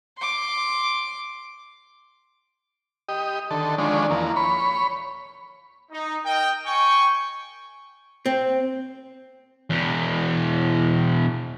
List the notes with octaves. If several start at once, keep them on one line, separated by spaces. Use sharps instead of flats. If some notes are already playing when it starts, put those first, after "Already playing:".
C6 D6
G4 D#5
D3 D#3 A4
D3 D#3 F3 G#3 C#4 D4
E2 F3 A#3
C#5 B5
D#4
A#4 D#5 G5
G5 G#5 C#6
C4
E2 B2